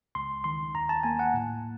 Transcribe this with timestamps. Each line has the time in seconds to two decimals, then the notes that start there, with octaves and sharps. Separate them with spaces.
0.15 C#2 C6
0.44 D#3 C6
0.75 D#2 A#5
0.89 A5
1.03 A#3 G#5
1.19 F#5
1.34 A2